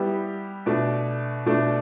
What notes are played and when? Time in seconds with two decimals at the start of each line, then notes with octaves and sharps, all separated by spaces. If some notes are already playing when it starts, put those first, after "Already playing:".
Already playing: G3 B3 E4 G4
0.66 B2 A3 D4
1.46 B2 A3 D4